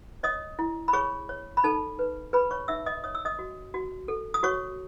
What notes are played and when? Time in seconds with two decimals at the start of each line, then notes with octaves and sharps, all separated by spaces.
0.23 C#5 D#5 D#6
0.59 E4
0.88 B5
0.93 G#4 C#5 C#6
1.29 C#5
1.57 B5
1.64 D#4 A4 A5
1.99 B4
2.33 G#4 B4 B5
2.51 C#5 C#6
2.68 D#4 E5 E6
2.86 D#5 D#6
3.04 C#5 D#6
3.15 E6
3.25 D#5 D#6
3.39 F#4
3.74 F#4
4.08 A4
4.34 D#6
4.43 F#4 C#5 C#6